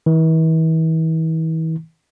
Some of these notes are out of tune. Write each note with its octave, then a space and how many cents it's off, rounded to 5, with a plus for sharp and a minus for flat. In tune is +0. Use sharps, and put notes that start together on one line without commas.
E3 -40